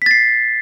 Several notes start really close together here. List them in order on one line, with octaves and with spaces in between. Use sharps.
B6 A6 C7